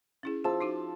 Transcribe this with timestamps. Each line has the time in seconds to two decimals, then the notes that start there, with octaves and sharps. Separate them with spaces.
0.23 C#4 E4 G#4
0.44 F3 G#4 A5 E6
0.61 D#4 F4 F#4